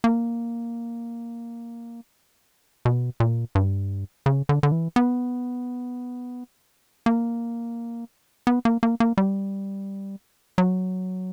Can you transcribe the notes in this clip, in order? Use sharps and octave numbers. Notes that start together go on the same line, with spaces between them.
A#3
B2
A#2
G2
C#3
D3
D3
E3
B3
A#3
B3
A#3
A#3
A#3
G3
F#3